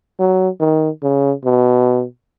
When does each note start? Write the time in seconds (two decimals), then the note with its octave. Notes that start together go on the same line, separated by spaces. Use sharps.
0.19 F#3
0.60 D#3
1.03 C#3
1.45 B2